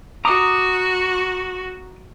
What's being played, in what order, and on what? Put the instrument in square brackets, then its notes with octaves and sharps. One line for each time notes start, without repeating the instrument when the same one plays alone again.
[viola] F#4 [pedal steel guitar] A#5 D6 D#6